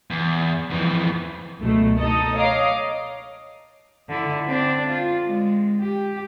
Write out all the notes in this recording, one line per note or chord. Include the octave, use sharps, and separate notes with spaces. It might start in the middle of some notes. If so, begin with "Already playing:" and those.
E2
F2 E3
C#2 F#2 B2 A3
D#4 A4 D#5
C#5 D#5 F5 A#5 D6 C7
D3 E4
C4 D4
F4
G#3
G4